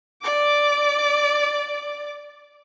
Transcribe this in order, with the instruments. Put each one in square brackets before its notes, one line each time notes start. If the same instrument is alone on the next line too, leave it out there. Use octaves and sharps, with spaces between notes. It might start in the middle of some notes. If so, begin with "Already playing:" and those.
[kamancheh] D5 D6